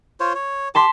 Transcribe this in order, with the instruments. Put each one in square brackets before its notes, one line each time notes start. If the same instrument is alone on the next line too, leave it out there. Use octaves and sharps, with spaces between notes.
[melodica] F4 C5 C#5
C#5
[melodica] G4 [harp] A5 C6 B6